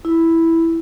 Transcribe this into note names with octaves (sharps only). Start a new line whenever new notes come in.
E4